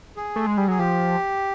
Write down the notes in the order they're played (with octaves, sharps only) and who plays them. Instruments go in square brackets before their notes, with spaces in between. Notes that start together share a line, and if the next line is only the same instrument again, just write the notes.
[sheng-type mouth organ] G#4
[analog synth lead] A3
G#3
G3
[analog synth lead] F#3 [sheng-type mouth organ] G#4
[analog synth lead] F3 [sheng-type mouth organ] G4